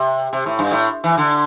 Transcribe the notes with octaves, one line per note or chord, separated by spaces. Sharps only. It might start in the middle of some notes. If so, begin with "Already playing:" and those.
Already playing: C3
C3
A2
G2
A2
E3
D3